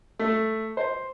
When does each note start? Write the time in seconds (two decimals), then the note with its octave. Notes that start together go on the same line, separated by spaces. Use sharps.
0.19 A3
0.77 C5